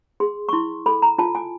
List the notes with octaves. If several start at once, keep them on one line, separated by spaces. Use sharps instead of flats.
G#4 C6
C#6
E4 C6
A4 B5
A#5
F4 A5
G#5